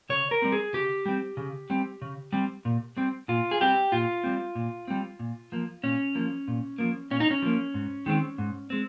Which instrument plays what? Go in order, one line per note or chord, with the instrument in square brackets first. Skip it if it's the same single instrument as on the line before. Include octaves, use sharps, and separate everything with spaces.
[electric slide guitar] C#3 C#5
A#4
G3 C4
G#4
C#3 G4
G3 C4
C#3
G3 C4
C#3
G3 C4
A#2
G3 C4
A#2 F4
G#4
G3 C4 G4
A#2 F4
G3 C4
A#2
G3 C4
A#2
F3 A#3
A#2 C#4
F3 A#3
A#2
F3 A#3
A#2 C#4
D#4
C#4
F3 A#3
G#2
D#3 G#3 C4
G#2
G#3 C4